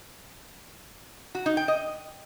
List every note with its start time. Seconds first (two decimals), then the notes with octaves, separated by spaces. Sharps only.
1.35 F#4
1.46 D#4
1.57 G5
1.68 D#5